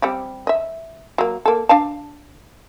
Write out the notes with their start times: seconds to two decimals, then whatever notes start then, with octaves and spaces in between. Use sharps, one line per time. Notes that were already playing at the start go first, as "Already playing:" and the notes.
0.02 G3 C4 G4
0.47 D#5 E5
1.18 F#3 A#3
1.45 A#3 A4
1.69 D4 F5 A5